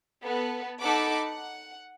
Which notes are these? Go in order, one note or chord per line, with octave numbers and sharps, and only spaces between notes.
B3 A4
D#4 A4 F#5 B5 D6
F#5